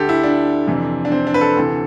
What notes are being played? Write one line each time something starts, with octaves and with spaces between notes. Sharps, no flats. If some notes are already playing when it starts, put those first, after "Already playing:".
Already playing: D2 D3 G4 A4
E4
D4
F2 C3 E3
D4
C4
D4
B4
A4
D2 C3 E3